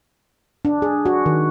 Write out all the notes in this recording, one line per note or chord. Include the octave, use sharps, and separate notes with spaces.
D4
G#4
F#4
D#3